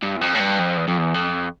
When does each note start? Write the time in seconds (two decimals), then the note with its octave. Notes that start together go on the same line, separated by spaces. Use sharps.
0.03 G2
0.17 E2
0.21 F2
0.35 A2
0.40 G2
0.59 F2
0.77 E2
0.88 F2
0.98 E2
1.14 F2